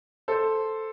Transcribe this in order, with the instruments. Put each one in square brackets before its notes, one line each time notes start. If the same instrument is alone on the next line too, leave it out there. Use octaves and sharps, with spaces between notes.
[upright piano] A4 C5